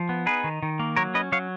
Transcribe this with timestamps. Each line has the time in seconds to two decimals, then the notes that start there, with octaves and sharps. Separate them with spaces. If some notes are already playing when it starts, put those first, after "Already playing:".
Already playing: F3
0.09 B3
0.26 D#4 G#4 B4
0.44 D#3
0.63 D#3
0.80 A#3
0.96 F#3 A#4 C#5
1.14 C#4 B4 D#5
1.32 F#3 C#5 F5